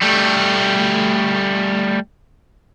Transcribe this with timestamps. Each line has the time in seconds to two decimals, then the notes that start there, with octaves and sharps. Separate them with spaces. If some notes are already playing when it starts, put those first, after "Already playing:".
0.01 G3 A3